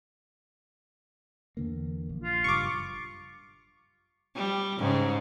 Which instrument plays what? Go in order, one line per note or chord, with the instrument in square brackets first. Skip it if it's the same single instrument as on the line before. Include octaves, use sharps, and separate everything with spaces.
[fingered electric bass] E2 D3 A#3
A#1
[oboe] F4
[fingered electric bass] F#1 G2 [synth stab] C#6 D6
[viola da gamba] G3
G#2 C#3